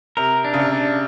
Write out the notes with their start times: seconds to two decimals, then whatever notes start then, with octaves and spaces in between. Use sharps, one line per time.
0.17 C3 A#4
0.44 D4
0.54 C#3
0.59 C3
0.73 D4